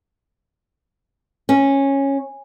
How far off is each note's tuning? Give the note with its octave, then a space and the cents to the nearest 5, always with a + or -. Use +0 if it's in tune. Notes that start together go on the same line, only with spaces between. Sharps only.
C#4 -10